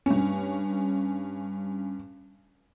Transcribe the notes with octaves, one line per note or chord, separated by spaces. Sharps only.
G2 C#4